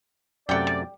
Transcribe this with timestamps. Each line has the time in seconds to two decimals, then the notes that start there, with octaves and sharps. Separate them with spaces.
0.49 F#2 C3 A3 D5 F#5 G5
0.67 G3